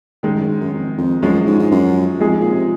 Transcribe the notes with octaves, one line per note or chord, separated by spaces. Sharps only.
F#2 D#3 G#3 D#4
F#2
G#2
F#2
F2
F2
F#2 F3 G#3 C#4
G#2
G#2
F#2
F2 F3 G#3 D#4 G#4
A#2
C3